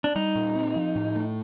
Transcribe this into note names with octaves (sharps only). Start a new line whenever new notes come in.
D4
G3 D#4
A#2
C4
F3
A2
A3